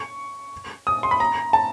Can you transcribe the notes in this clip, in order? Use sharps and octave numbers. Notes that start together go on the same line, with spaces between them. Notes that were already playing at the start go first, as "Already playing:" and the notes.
Already playing: C#6
D#6
C6
B5
A#5
A5